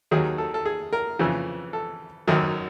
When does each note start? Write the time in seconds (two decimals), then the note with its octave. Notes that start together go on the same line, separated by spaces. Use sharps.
0.11 D#2 D#3 F#3 G#4
0.38 A4
0.54 A4
0.65 G#4
0.93 A#4
1.19 F2 C#3 E3
1.73 A4
2.27 G#1 F#2 D#3 F#3